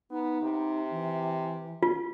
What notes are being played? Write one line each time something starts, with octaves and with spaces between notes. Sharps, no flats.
B3 D#4
C3
E3
F4